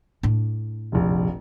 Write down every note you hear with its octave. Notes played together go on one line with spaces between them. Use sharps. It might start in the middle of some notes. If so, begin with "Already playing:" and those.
A2 D4
F1 A#1